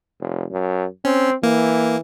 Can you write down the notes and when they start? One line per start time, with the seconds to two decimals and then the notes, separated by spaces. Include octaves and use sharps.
0.20 F1
0.51 F#2
1.05 C4 C#4
1.43 E3 A#3